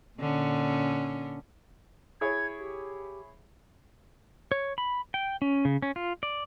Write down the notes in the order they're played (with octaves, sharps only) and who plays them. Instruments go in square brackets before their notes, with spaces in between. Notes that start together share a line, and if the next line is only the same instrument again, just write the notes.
[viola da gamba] A#2 D3 C#4
[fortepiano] E4 G#4 C#5 [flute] G#6
[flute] G4
[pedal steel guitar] C#5
B5
G5
C#4
C#3
C#4
F4
D5